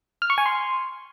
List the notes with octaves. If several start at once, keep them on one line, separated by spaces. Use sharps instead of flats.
F6
C#6
G#5
C6